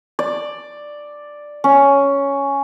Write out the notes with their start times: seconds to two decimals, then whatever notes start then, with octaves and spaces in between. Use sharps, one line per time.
0.19 D5
1.64 C#4